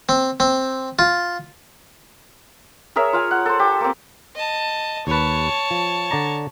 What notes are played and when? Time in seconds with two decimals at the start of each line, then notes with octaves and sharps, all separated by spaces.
0.09 C4
0.40 C4
0.99 F4
2.96 G#4 A#4 C#5 E5
3.13 F4 F5 G#5
3.31 F#5
3.46 A4 C5
3.59 G4
3.81 A#3 C4
4.36 D#5 A5
5.07 D#2 B4 C#5 A5
5.71 F3
6.11 D3 D5 A#5